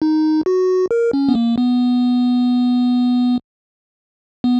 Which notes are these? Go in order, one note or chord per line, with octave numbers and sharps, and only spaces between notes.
D#4
F#4
A#4
C#4
B3
A#3
B3
B3